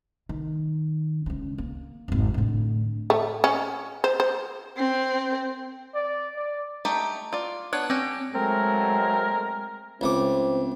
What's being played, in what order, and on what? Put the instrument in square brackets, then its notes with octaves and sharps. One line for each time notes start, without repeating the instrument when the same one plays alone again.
[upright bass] D#3
C#2 C#4
A#3
G#1 F2
A2 D3
[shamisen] A3
C#4
C5
C5
[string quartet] C4
[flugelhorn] D5
D5
[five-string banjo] A3 D#4 G4 [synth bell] A#5
[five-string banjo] F4 D5
[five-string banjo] B3 D4 C#5 [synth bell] F#6
[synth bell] C4 [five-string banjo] C#4 G4
[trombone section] F#3 A3 [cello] G#3 [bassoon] C4 [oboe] A#4
[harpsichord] C#2 A3 D6 [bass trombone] C4